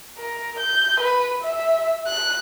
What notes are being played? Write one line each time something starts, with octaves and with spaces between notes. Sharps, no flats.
A#4
G6
B4
E5
F#6